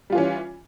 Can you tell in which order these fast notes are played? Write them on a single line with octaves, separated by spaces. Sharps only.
G3 F4 E3 C#4